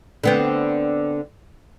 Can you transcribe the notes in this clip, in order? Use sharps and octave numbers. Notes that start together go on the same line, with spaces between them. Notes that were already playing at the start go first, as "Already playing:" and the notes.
D3 B3 C4